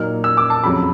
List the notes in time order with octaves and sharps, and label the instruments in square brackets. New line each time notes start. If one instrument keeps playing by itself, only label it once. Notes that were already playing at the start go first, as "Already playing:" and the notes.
Already playing: [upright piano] A#2 F#3 A#3 D#4 F6
E6
D6
A5
F2 C#3 F#3 B5